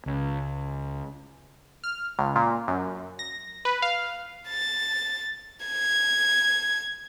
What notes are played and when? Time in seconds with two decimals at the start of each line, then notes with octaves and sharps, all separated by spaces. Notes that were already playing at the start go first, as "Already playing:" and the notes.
0.06 C#2
1.84 F6
2.19 C#2
2.36 A#2
2.68 F#2
3.19 A#6
3.65 B4
3.82 F5
4.48 A6
5.66 G#6